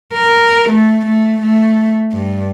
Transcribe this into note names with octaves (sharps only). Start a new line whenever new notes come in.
A#4
A3
A3
A3
G2